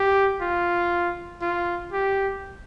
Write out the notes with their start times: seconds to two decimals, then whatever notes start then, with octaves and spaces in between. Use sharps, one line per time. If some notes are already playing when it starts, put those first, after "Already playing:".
Already playing: G4
0.41 F4
1.42 F4
1.93 G4